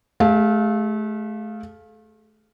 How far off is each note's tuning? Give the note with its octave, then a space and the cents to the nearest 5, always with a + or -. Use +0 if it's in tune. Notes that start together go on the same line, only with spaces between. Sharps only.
A3 -30 G4 +40 F5 +0